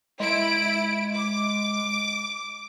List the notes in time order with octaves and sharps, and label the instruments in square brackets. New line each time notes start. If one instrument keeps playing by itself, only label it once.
[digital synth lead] G#3 [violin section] E4 D7
[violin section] D6